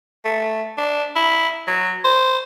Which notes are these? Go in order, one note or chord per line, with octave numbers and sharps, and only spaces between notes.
A3
D4
E4
F#3
C5